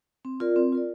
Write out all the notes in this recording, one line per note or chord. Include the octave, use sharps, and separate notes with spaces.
C4
F4 A#4 D5
C4
F4 A#4 D5